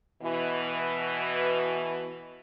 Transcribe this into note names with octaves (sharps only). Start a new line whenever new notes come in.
B2 E3